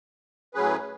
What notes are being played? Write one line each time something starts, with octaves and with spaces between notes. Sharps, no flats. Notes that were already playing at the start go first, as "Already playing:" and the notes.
A2 F#3 C#4 G#4 B4